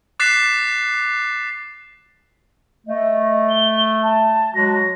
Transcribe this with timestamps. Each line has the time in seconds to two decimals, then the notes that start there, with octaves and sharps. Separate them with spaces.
0.20 D6 F#6 A6 B6 C7 E7
2.87 A3 D#5
3.49 G7
4.03 A5
4.55 F#3 G#3 F#4 A#6